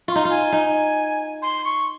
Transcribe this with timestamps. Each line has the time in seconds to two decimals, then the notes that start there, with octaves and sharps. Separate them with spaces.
0.08 F4 C#6
0.12 D#4 C6
0.25 F4
0.30 G#5
0.52 D#4
1.42 C6
1.65 C#6